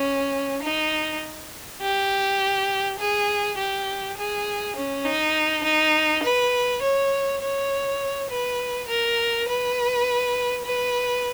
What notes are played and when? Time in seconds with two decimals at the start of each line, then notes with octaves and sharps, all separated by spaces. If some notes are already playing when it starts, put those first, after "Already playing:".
Already playing: C#4
0.63 D#4
1.81 G4
2.99 G#4
3.58 G4
4.17 G#4
4.76 C#4
5.05 D#4
5.64 D#4
6.23 B4
6.82 C#5
7.42 C#5
8.30 B4
8.88 A#4
9.48 B4
10.66 B4